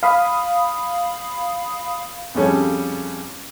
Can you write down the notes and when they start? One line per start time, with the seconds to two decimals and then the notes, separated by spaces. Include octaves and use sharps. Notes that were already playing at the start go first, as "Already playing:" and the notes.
0.03 F5 B5 D#6
2.34 F2 C#3 G3 C#4 A4